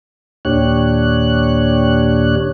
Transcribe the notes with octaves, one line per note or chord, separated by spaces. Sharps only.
D#2 A#2 D4 G4 C#5 F#6